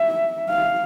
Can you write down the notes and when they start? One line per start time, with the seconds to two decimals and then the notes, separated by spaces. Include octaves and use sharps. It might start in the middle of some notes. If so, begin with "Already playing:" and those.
Already playing: E5
0.50 F5